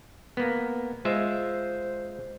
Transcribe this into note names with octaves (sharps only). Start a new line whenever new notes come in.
A#3 B3
G#3 F4 C5 E5